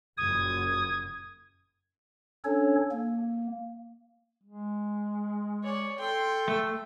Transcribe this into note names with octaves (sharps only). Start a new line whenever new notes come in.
F#1 F#2 A#2 D#6 G#6
C#4 D4 A4 C#5
A#3
G#3
C#5 D5
A4 G5 C6
A3